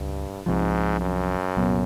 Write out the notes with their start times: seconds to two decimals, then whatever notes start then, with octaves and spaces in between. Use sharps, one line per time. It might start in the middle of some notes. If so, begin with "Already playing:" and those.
Already playing: C#2 G2
0.46 C2 G#2 C3 F3
1.01 F#2
1.57 C2 A#2 F#3 B3